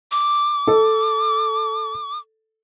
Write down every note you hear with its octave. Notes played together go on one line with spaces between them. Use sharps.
D6
A4